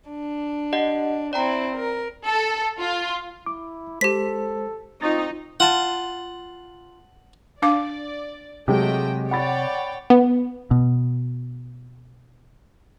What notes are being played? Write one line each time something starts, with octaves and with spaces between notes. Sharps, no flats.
D4
G4 D#5 F#5
C4 E4 D5 G5 A#5
A#4
A4
F4
E4 D6
G#3 G4 A4 C5 B6
C4 D#4 F4 C#6 A6
F4 F#5 A5
D4 D5 F5 D6
C3 F#3 G#3 A3 G4 D#5 G5
C#5 D5 F#5 G5 B5 A6
B3
B2